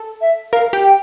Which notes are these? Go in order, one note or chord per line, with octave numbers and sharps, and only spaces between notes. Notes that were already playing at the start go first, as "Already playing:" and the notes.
Already playing: A4
E5
A#4 F5
G4
G5